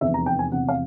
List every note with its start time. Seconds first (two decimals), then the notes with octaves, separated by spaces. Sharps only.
0.01 F1 E2 C3 E5
0.14 A#5
0.26 G5
0.39 G#5
0.52 F1 E2 C3 F#5
0.69 F5